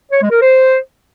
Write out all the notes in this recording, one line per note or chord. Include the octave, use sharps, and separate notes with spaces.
C#5
G#3
A#4
C5